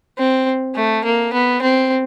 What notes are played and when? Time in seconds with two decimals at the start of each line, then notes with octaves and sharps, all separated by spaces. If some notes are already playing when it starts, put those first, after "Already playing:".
0.18 C4
0.75 A3
1.05 A#3
1.33 B3
1.62 C4